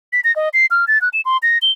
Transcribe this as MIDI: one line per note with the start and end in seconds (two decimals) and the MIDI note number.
0.13 0.21 95
0.24 0.34 94
0.36 0.49 75
0.54 0.66 96
0.71 0.85 89
0.88 1.01 93
1.01 1.09 90
1.13 1.21 100
1.25 1.37 84
1.43 1.58 94
1.62 1.71 103